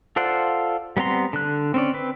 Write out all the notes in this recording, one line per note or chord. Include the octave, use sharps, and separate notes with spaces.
F4 A4 C5 D5 F#5
G3 B3 C4 A#5 C6
D3 F#6
C4 C#4 D5
C4 B4